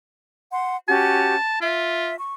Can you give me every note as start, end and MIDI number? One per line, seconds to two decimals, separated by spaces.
0.51 0.76 78
0.51 0.76 84
0.88 1.35 61
0.88 1.35 66
0.88 1.35 67
0.88 1.58 81
1.61 2.12 65
1.61 2.18 76
2.19 2.35 85